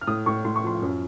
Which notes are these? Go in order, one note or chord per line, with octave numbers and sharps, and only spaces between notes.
F6
A2 D#6
A2 C#6
A2 C6
C#6
F3 C6
F#2